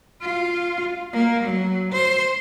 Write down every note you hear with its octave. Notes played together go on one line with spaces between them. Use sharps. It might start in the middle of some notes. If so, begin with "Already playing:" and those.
F4
A#3
F#3
C5